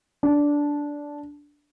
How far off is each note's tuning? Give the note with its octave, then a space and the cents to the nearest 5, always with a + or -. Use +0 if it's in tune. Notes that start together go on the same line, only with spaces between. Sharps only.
D4 -10